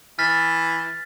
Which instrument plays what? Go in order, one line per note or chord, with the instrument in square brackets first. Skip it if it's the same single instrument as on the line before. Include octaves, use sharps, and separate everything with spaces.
[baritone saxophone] E3 [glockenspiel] F6 A6 B6